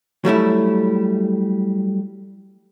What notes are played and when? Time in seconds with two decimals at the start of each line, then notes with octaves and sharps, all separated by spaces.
0.25 F#3 G3 A3 E4